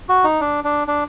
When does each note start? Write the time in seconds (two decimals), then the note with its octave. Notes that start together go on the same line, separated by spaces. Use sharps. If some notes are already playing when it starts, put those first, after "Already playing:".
0.09 F#4
0.24 D#4
0.40 D4
0.64 D4
0.87 D4